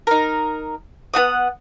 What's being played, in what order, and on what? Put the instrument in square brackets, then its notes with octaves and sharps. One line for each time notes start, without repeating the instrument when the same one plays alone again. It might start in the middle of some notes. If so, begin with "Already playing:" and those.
[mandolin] D#4 A#4
B3 F#4 F#5 D#6